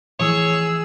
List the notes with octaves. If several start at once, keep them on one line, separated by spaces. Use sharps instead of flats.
A2 E3 F3 G#4 C#5 E6